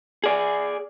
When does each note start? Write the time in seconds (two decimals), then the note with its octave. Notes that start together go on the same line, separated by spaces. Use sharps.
0.24 G#4 D5 G#5